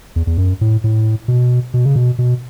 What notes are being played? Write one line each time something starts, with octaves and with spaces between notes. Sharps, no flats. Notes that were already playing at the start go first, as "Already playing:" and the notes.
E2
E2
F#2
A2
A2
B2
B2
C#3
B2
B2